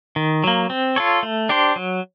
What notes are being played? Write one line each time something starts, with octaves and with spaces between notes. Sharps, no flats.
D#3
F#3 A#3
C4
F4 A4 C#5
A3
D4 G4 C5
F#3